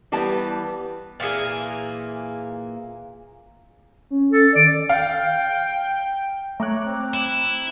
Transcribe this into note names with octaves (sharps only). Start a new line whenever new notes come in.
E3 G3 B3 A5
A#2 E3 A#3 G#4
C#4
A4
D#3 D5
F5 G5
A3 C#5 A#5 D6 F#6
C4
E4